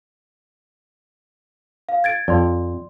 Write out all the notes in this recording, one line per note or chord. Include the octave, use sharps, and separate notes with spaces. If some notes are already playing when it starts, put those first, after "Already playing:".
F5
G#6 A6 D7
F2 D5 C6